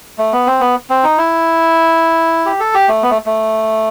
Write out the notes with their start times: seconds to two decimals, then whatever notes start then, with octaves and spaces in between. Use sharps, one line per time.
0.18 A3
0.33 B3
0.47 C4
0.61 B3
0.90 C4
1.04 D#4
1.18 E4
2.46 G4
2.60 A4
2.74 G4
2.88 A3
3.03 B3
3.10 A3
3.26 A3